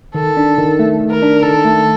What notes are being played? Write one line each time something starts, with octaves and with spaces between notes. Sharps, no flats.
D#3 A4
D4
D#3
A3
D#3
A#4
D4
D#3 A4
A3